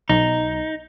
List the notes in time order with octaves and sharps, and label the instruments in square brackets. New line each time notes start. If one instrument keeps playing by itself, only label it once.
[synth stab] B1 [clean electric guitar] D#4